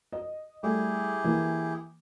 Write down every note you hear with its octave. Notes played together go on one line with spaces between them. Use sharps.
D#5
G3 A3 E4 G4 G#4
E3 A#3